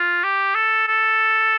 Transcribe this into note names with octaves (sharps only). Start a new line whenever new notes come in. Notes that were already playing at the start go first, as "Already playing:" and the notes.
Already playing: F4
G4
A4
A4